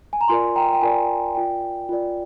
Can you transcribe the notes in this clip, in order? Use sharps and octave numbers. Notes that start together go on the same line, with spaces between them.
G#5
A#5
F4 A#4 D5 G#5 C6
G5 A#5
G5
F4 A#4 D5 G#5
F4 A#4 D5 G5
F4 A#4 D5